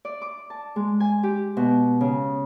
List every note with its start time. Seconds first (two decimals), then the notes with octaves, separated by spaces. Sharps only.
0.05 D5
0.22 D6
0.50 A5
0.76 G#3
1.00 G#5
1.23 G4
1.57 B2
2.01 C#3